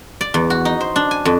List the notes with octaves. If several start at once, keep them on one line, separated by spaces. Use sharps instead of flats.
D5
E2
F#4
D#4
C5
D4
G#5
F2